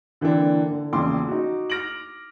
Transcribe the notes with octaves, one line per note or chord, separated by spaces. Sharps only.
D3 E3 A#3 C4 D4
D3
E1 A#1 C#3 C6 D6
D#4 F#4
F6 A#6 D7 F#7